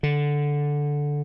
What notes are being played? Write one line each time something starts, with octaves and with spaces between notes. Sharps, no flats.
D3